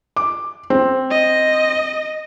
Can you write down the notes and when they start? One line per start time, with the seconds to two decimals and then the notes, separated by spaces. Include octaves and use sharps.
0.16 D6
0.70 C4
1.10 D#5